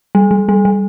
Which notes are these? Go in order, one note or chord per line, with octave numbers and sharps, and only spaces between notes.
G3
G3
G3
G3